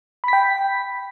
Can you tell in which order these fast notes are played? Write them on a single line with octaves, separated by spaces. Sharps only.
B5 B6 G5